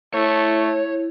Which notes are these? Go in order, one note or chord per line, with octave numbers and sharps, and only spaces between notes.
A3 E4 C#5